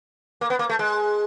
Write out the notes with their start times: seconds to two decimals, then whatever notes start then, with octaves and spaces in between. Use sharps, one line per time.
0.41 A#3
0.50 B3
0.59 A#3
0.69 A3
0.79 G#3